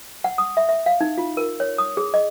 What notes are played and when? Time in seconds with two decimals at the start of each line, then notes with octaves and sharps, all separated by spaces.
0.24 F#5
0.38 D#6
0.57 E5
0.69 E5
0.86 F5
1.01 D#4
1.18 F4
1.37 A#4
1.60 C#5
1.78 D#6
1.97 G#4
2.14 D#5